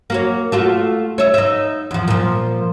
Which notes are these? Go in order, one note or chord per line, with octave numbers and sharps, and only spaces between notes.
A#3 F#4 C#5
A3 F4 F#4
C#5 E5
D#4 E5
E2 F3
A#2 F3